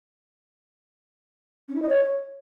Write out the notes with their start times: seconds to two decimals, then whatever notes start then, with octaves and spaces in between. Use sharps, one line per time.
1.68 C#4
1.75 E4
1.82 D#5
1.89 C#5